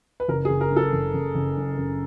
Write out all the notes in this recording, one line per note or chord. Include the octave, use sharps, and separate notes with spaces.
B4
F#1 A#4
G#4
F#1
A#4
F#2
A4
F#1
F#1
F#1
F#2
F#1